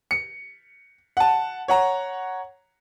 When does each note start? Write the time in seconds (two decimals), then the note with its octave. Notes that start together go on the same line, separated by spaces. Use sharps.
0.11 C#7
1.17 F#5 A5
1.68 C#5 F#5 A#5